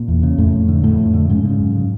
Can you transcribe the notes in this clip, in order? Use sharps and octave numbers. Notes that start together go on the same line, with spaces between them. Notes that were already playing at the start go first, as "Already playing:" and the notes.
Already playing: A#2 A#3
E2
C#3
F2 A2 A3
F2
D3
F2 A2 A3
F2
D3
G#2 C#3 G#3
C#3
F#2
C#3